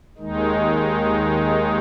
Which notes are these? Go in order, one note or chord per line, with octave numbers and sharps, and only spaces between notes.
D#2 D#3 G#3 D#4